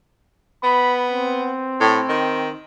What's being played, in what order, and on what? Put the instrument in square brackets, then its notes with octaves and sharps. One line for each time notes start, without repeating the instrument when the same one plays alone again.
[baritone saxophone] B3 [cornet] B5
[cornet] C4
[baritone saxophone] A2
D#3